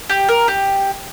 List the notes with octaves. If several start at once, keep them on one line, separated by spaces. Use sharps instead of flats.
G4
A#4
G4